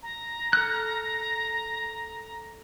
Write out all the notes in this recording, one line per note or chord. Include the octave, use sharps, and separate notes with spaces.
A#5
A4 F6 F#6